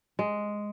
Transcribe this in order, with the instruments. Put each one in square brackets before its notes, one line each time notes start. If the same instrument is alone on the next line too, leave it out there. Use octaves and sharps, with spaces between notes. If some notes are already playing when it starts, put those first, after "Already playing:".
[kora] G#3